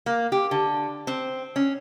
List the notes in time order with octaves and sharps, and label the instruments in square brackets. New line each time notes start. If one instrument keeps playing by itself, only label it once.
[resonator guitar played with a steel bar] A#3
G4
D3
C4
C#4